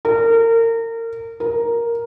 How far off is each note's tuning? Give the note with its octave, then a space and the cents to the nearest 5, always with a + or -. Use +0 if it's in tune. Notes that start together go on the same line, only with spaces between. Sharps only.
A#4 -30
A#4 +5